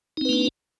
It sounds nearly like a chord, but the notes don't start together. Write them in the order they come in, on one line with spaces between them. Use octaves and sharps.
D#4 C4 B4 A#3 D4